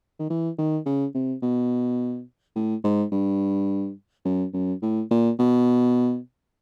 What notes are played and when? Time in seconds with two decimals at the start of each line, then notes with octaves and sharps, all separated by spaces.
0.19 D#3
0.30 E3
0.58 D#3
0.86 C#3
1.15 C3
1.42 B2
2.56 A2
2.84 G#2
3.12 G2
4.25 F#2
4.54 F#2
4.82 A2
5.11 A#2
5.39 B2